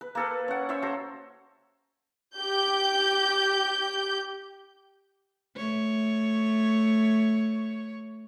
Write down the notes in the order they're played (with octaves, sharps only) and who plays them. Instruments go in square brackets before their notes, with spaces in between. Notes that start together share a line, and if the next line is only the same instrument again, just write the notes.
[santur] B4
A#3 A4 B4
C#4 F#5
C#4 C5 C#5 E5
F#4 A4 C5
[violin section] G4 G6
[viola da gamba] A3 C#5